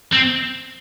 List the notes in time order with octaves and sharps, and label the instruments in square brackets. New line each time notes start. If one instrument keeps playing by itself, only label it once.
[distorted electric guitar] C4